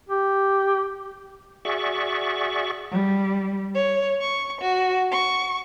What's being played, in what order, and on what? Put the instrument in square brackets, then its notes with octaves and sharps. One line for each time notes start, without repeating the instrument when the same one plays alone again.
[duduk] G4
[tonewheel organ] F#4 G#4 D5 E5 C#6
[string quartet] G3
C#5
C#6
F#4
C#6